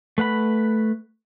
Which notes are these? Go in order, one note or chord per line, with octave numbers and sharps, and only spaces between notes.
A3 B4 F#5 B5